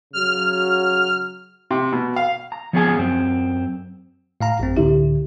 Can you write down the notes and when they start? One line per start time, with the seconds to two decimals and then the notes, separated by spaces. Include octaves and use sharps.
0.13 C#3 F#3 F6
1.71 C3
1.93 B2
2.16 F5
2.52 A#5
2.73 F3 B3 C#4 G#4 D#5 G#5
2.99 F#2 C4
4.41 A2 F5 A#5
4.59 A1 F#2 C4
4.76 C#2 A2 D3 E4 G4 E5